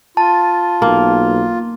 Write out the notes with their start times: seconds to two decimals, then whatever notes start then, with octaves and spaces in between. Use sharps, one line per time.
0.17 F4 A5
0.82 B1 A#3